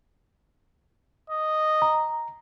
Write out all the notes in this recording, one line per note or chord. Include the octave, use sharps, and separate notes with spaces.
D#5
A#5